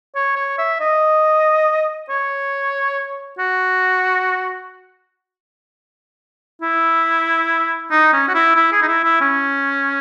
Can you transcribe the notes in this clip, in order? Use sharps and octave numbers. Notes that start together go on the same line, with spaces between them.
C#5
C#5
E5
D#5
C#5
F#4
E4
D#4
C#4
F#4
E4
E4
G#4
D#4
E4
E4
C#4